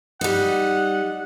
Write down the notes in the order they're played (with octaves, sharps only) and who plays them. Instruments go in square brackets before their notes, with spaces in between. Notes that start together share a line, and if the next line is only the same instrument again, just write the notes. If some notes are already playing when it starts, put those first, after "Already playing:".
[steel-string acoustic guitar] G3 D#4 [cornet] F#5